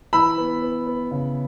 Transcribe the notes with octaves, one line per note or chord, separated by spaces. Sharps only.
E3 B5 E6
B3
B3
B3
C#3